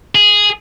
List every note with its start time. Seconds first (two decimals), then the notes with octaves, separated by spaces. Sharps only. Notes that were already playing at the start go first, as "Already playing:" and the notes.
0.15 G#4